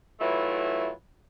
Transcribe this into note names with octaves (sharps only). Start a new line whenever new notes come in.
E3 F#3 A3 E4 F4